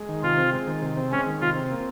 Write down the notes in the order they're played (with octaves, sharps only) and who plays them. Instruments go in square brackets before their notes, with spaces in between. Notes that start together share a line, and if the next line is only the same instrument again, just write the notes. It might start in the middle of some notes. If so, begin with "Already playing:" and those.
Already playing: [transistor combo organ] G#3
D#3
[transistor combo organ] C3 [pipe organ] F4
[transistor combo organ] C4
G#3
D#3
C3
C4
[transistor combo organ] G#3 [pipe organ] C#4
[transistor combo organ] D#3
[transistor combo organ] C3 [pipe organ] F4
[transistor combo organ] C4
A#3